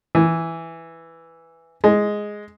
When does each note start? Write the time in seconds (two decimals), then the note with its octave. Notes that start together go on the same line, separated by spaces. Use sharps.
0.15 E3
1.84 G#3